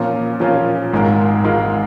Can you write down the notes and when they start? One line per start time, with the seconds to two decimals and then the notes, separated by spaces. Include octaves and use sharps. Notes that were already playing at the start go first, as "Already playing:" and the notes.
Already playing: A#2 F3 A#3 C#4 F4
0.40 A#2 F3 A#3 C#4 F4
0.93 G#1 G#2 G#3 F4 A#4
1.43 G#1 G#2 G#3 F4 A#4